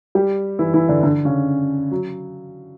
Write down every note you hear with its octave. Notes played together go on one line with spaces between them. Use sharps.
G3 G4
E3 E4
E3 E4
D3 D4
D3 D4
C#3 C#4
F#3